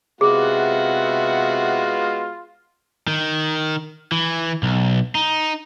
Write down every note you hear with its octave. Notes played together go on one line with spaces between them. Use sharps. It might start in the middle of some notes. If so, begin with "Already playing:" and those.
C3 G#3 B3 F4 F#4 G#4 E5 F#5
D#3
E3
B1
D#4